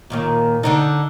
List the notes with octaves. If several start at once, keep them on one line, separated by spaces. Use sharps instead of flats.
D#2 A#2 D#3
D3 D4 D#4